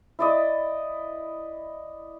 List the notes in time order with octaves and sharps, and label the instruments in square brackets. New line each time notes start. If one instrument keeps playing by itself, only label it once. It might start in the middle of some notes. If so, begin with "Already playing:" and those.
[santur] E4 D5 D#5